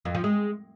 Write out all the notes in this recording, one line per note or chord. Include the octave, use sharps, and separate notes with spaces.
F2
F3
G#3